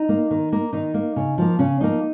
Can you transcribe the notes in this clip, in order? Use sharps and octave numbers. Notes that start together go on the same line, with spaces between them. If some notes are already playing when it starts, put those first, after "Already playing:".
Already playing: D#4
A#3
D#3
A#3
D#3 D#4
A#3
C#3
F3 A#3
C#3 C#4
F3 A#3 D#4